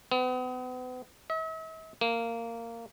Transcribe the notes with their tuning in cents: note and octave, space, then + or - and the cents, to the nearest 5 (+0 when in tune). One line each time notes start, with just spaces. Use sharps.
B3 +40
E5 -45
A#3 -15